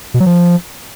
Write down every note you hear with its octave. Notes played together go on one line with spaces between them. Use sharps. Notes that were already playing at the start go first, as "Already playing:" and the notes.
B2
F#3
F3